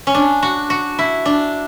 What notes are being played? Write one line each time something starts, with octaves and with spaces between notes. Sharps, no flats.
C#4
D4
F#4
F#4
E4
D4